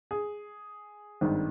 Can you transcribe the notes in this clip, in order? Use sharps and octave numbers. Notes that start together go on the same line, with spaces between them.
G#4
G#1 G2 D#3